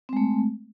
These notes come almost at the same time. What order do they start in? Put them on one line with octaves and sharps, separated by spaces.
C4 G#3 A3